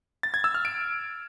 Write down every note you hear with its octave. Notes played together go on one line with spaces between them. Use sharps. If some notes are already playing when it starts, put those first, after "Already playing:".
A6
G#6
E6
F6
D7